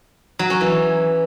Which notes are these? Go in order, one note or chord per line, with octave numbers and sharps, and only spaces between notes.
F#3
C#4
E3